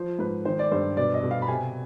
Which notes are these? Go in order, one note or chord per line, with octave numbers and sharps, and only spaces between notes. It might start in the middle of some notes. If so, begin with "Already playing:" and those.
Already playing: F3 C5
G#2 B4
D#3 C5
D5
G2 C5
B2 D5
D#5
B2
F5
B5
C3 G#5